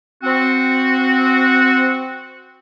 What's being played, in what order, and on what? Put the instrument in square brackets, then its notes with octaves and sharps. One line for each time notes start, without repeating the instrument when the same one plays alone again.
[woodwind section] C4 F#4